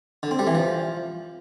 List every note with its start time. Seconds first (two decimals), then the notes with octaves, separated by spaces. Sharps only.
0.23 D3
0.31 C4
0.39 G3
0.47 E3
0.55 F3